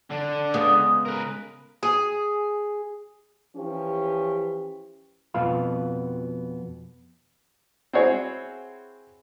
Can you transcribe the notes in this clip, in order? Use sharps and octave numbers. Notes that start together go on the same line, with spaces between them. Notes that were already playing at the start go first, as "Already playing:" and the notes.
D3 D4
C#3 G#3 B3
A#4 B4
G#4
E3 F3 C#4 G4
F2 B2 B3 F4 F5 B5
C4 E4 F#4 G#4 C#5